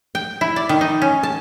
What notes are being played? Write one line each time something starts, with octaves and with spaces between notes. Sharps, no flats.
G5
E4
D5
D#3
D#4
C#4
A5